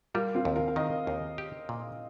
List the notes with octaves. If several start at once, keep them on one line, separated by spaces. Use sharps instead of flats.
G3 F4 A#4
C4 F4
D#2
F4 A#4
F5
D#3 A#4 D#5
D#2
G4
A#2